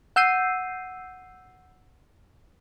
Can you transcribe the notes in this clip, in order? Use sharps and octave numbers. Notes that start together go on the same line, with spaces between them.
F#5 E6 G6 C7 D#7